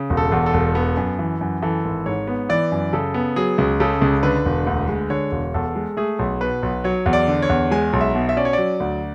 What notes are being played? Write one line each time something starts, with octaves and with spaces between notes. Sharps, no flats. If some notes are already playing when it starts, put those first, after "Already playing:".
Already playing: C#3
E1
A4
E2
A4
E1
B3
F#2
E3
F#2
E3 A4
G#1
G#2 C#5
B3
E3 D5
F#2
C#3 A4
B3
F#3 G#4
C#2
C#3 A4
C#2
D3 B4
E1
D2
G#3
D3 C#5
E1
E2 A4
G#3
A3 G#4
B1
B2 B4
B1
F#3 C#5
E2
D5
D3
C#5
E2
G#3 G#5
B1
E5
B2
E5
C#4 D5
C#5
F#3 D5
D2